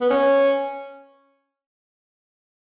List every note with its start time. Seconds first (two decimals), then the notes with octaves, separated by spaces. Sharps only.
0.01 B3
0.10 C#4